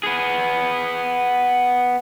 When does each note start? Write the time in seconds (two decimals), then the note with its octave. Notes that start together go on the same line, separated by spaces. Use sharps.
0.03 B3 G#4